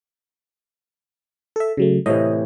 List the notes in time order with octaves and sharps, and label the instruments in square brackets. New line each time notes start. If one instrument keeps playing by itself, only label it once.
[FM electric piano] A4 E5
C#3 F#3 A3
[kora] A2 C3 E3 [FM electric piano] D#5